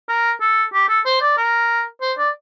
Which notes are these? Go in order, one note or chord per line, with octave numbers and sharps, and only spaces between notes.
A#4
A4
G4
A4
C5
D5
A#4
C5
D5